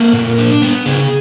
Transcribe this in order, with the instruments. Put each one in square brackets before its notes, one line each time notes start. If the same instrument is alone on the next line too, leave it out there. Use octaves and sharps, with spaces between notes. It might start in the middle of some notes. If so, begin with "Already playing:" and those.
Already playing: [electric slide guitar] A#3 A4
A#2
D4
B3
C#3 G#4